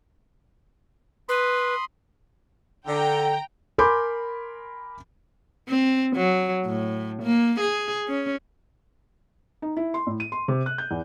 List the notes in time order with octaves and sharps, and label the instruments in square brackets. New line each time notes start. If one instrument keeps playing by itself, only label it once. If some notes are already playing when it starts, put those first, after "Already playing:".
[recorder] B4 [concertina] B5 C6 D#6
[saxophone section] D3 [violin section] G5 A#5
[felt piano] A#4 G#5 B5 C6 D6 G6
[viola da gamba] C4
F#3
A2
A#3
G#4
C#4
[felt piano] D#4
E4
C6
A2
D#7
C6
C3
F#6
G6
E2